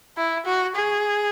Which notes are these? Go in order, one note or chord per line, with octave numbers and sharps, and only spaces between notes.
E4
F#4
G#4